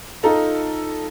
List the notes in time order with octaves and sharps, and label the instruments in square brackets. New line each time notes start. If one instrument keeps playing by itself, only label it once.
[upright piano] D#4 F4 A4 A#5